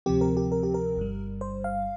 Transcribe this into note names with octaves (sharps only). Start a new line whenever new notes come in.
D2 C3 F3 C4 G4
A#4
G4
A#4
G4
A#4
G1 G2 G3
C5
F5